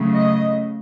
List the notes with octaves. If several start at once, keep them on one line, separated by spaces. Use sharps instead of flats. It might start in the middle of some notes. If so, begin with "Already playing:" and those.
Already playing: C#3 F#3 A3
D#5